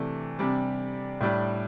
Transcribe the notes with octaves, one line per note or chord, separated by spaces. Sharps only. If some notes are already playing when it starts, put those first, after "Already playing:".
Already playing: C3 E3 A3 D4
C3 G3 D4
A2 G3 D4